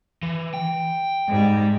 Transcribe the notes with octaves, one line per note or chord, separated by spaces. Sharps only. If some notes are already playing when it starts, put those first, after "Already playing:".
E3
G5
G#2 G3